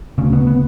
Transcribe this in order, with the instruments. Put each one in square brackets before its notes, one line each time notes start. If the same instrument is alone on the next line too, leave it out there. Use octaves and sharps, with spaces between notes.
[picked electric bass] D2 C#3 C#4
B3
B3